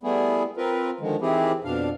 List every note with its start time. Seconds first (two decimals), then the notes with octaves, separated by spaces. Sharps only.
0.03 G3 A3 B3 E4 G#4
0.57 C4 F4 A#4 B4
1.00 D3 D#3 F3 G#3
1.21 D#3 E3 C4 E4 G4 G#4
1.64 F2 B2 D4 F5